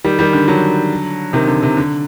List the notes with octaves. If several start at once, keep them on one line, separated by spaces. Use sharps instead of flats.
D#3 G3
D#3 G3
D3
D3 F#3
C3 D#3
D3
C3
D3